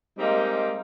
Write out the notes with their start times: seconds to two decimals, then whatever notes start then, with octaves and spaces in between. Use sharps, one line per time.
0.18 G3 G#3 A#3 C4 D#4